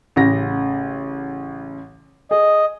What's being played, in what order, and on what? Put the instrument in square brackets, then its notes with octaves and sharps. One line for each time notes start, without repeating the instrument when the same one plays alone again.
[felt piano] A1 C#3 A#6
[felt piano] G#4 [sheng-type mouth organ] D#5